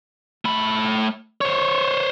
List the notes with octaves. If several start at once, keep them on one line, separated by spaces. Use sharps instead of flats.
A3 B5
C5 C#5